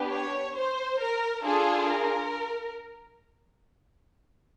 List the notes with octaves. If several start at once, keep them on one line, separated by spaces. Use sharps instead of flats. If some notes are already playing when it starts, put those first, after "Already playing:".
Already playing: B3 D4 G4
C#5
C5
A#4
D4 F4 G#4 A4
A#4